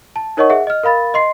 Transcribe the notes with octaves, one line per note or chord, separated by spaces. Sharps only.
A5
D#4 A#4 C#5 D#5 F#5 C#6
G#4 E5 F#5
D#5 F6
A#4 F5 B5 A6
D#5 C6 C7